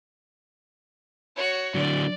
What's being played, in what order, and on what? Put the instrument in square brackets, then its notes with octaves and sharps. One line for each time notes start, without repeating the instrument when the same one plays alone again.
[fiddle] F#4 C#5
[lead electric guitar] D3 F#3 [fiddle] D5